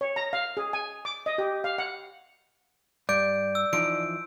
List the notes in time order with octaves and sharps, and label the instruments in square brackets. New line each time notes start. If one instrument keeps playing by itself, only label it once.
[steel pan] C#5
A#5
F5
G#4
G#5
D6
D#5
G4
F5
F#5
[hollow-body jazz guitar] G2 [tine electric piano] D5 [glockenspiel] G6 D7
[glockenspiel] E6
[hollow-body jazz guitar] E3 F3 D#4 [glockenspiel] D7